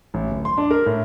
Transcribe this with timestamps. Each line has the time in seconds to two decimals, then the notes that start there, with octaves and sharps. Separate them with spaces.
0.14 A1
0.31 D1
0.45 C6
0.58 D4
0.71 A#4
0.86 A2